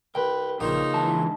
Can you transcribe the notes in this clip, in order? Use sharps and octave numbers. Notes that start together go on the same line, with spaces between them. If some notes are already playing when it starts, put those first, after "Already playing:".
C2 B4 G5
A#1 C#3 F3 A#3 D#4
G#2 E3 D4 A5